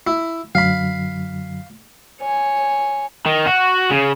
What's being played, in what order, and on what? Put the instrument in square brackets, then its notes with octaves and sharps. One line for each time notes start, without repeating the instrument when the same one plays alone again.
[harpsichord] E4
[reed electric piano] F#2 D3 F#3 [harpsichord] F5 B5
[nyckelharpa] C#5 G#5
[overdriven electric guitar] D#3
F#4
C#3